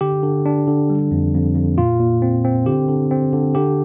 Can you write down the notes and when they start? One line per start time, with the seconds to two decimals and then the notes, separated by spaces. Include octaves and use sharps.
0.01 D3 G4
0.23 D3
0.46 D4
0.67 D3
0.90 G3
1.11 F2
1.34 F2
1.55 F2
1.77 A#2 F4
2.00 A#2
2.22 C4
2.45 C4
2.66 D3 G4
2.89 D3
3.11 C4
3.33 D3
3.55 D3 G4